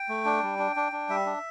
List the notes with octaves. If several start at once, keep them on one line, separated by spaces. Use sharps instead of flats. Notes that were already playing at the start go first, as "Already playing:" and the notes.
Already playing: G5
A3
D4
G3
D4
D4
D4
G3 E5
D4